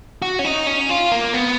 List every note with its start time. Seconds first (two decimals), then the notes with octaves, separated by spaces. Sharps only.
0.22 F#4
0.39 C#4
0.45 D#4
0.67 C#4
0.89 F4
1.12 A#3
1.34 B3